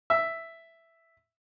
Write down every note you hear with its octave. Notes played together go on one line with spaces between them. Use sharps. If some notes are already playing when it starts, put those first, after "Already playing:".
E5